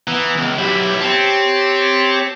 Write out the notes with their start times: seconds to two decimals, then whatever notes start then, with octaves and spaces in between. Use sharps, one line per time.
0.08 E3 B3 A#5
0.38 C#2
0.58 B1 F#3 E4 G4
1.00 C4 G4 C#5 A5